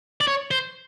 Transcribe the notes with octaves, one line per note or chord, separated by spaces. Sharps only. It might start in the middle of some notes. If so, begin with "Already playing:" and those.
D5
C#5
C5